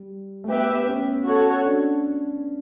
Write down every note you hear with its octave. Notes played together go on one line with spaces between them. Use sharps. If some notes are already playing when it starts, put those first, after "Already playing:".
Already playing: G3
A3
B3 G4 B4 E5
B3
B3
C#4
F#4 A4 C#5
D4